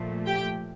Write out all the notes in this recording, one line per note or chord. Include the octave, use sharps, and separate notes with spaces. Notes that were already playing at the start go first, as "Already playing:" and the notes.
Already playing: A#2 F3 A3
G4 G5